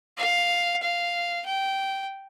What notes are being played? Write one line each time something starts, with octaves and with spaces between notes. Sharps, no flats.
F5
F5
G5